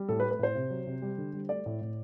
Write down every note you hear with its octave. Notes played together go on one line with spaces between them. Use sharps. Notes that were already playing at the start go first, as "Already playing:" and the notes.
Already playing: G3
A2 A4
B4
A3
B4
A2 C5
C3
F#3
C3
G3
D3
G3
A3 D5
A2
A2